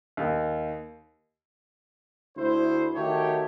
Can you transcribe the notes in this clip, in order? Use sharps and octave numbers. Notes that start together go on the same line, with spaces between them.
D#2
D2 E4 C5
D#3 A3 D#4 F#4 G4 C#5